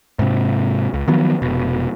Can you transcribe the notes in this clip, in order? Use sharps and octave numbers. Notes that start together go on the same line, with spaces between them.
G#2 C3
C#2
D#3 F3 F#3 B3
F1 B2